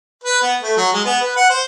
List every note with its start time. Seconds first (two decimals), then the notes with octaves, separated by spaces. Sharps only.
0.24 B4
0.42 B3
0.62 A3
0.77 F#3
0.93 G#3
1.05 B3
1.22 B4
1.36 F#5
1.50 C5